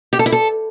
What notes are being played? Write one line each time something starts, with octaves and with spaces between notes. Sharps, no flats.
G4
A4
E4
A4